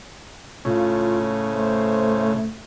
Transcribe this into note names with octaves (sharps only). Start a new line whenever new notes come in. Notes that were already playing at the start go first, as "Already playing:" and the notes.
A2 C#3 F4
A3 C5